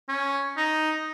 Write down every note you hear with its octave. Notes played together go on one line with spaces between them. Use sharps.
C#4
D#4